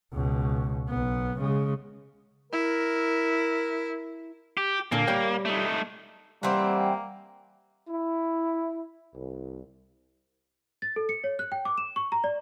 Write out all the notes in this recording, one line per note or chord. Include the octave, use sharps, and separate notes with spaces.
C#2 B2
B1 B3
C#3 G#3
E4 A#4
G4
A#2 D3 A#3
G3 C#5 G5
A3 D#4
E3 G3 A#3 C4 F#5
E4
C2
A6
A4
C#7
C#5
F#6
G5
D6
E7
C#6
A#5
D5